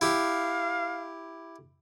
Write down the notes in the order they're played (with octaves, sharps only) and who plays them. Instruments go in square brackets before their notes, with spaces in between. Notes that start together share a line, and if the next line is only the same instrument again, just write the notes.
[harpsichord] E4 G4 [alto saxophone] F5